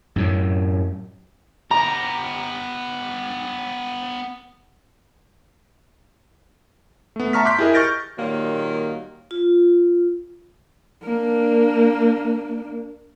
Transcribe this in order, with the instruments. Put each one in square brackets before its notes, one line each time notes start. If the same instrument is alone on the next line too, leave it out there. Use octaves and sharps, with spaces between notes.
[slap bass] F#2 A2 F#3
[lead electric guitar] B3 G4 [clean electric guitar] A#5
[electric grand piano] A3 B3
E5 A5 A#5 C#6 F6 B6
C6 D6 F#6 G6 B6
E4 G4 G#4 A#4 D#5
C#6 F6 G6 A6 A#6 D7
[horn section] A#2 D#3 F#3 G3 A#3
[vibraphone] F4
[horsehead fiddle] A#3 D4